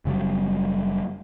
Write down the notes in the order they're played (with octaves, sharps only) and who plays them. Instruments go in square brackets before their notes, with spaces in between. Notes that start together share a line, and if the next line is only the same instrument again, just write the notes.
[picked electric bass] F#1 C#3 F#3 G3